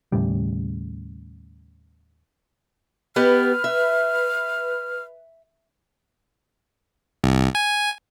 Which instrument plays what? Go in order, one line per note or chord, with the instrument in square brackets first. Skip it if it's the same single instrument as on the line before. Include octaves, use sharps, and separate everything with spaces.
[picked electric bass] D#2 A2 C#3 G3
[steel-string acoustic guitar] B3 G4 D#5 [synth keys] B4 [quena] F6
[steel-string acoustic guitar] E5
[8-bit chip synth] C2
G#5